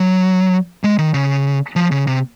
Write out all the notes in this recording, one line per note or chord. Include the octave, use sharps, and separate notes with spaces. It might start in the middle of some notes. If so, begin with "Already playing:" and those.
Already playing: F#3
G#3
D#3
C#3
F3
C#3
C3